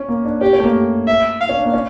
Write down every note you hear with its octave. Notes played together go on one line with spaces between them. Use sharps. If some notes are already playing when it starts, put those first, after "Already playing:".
Already playing: C#4
A#3
D4
C#4 G4
C#4
A3
A#3
E5
F5
C#4
D4
A#3
C#4